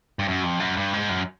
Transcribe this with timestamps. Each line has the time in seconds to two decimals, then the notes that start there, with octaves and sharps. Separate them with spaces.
0.19 G2
0.28 F#2
0.44 F2
0.60 F#2
0.76 G2
0.93 G#2
1.09 F#2